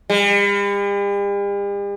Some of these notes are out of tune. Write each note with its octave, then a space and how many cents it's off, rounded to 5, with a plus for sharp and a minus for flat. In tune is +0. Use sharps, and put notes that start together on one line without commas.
G3 +45